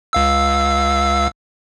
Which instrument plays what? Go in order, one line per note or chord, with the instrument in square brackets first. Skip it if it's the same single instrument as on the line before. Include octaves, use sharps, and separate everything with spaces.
[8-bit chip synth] C#2 F5 E6